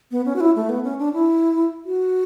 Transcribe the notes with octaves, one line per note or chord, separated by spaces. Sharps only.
B3
C#4
F#4
E4
A3
B3
C#4
D4
E4
F#4